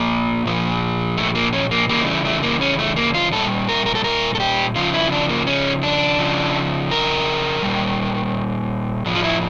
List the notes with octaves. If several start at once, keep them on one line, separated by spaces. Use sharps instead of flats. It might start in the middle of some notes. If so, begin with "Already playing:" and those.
Already playing: A#2 F3 A#3
A#2 F3
A3
A#3
C#4
A#3
C#3 E3 G3 A#3
A3
A3
A#3
C#4
A3
A#3
F4
A#2 G3 A4
A#4
A#4
A4
A#4
A4
G4
C#3 F3 F4
E4
D4
A#3
C#4
D4
C#3 F3
A#4
A#2 G3
A2 F3
F4
E4